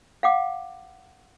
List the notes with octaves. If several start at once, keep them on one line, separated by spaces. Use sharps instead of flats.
F5 F#5 D6